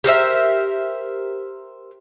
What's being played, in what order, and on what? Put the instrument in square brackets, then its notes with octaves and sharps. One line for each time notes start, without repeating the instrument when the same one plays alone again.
[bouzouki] G4 A#4 C5 E5